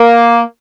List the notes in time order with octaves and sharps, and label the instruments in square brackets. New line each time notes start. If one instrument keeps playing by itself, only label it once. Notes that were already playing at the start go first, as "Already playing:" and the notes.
Already playing: [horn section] A#3